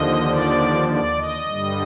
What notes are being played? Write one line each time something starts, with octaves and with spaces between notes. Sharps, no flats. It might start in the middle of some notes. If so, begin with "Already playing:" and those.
Already playing: D#2 D3 F3 D#5
D5
D5
D#5
G2 D3 G3